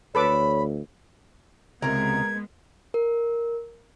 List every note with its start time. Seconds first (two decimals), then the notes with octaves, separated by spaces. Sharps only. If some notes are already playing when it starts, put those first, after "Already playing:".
0.15 D2 A4 B4 C#5 B5 D6
1.82 C#2 C3 G#3 B3 A#4 A#5 G#6
2.94 A#4